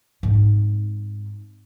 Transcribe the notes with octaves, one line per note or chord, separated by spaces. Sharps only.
G#2 C4